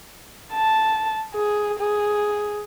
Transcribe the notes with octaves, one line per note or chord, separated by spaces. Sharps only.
A5
G#4
G#4